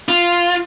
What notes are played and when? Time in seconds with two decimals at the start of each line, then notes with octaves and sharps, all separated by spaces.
0.08 F4